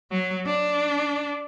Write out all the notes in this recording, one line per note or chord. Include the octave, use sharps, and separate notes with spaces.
F#3
D4